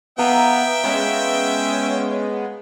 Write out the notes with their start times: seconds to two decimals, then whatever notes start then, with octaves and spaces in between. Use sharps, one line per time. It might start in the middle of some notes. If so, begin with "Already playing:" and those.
0.18 B3 E5 F5 G5 A#5
0.84 G#3 B3 C#4 D#6